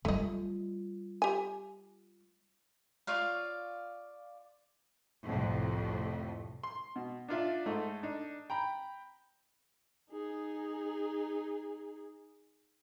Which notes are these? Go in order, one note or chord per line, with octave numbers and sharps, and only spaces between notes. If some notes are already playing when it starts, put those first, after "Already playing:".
G3 A3 F4 D#5
G4 G#5
F4 C#5 D5 F5
C2 F2 A2
C6
B2
D4 D#4 F4 D5 E5
G#2 A3 D#4
D4 D#4
G5 A#5 B5
D#4 G#4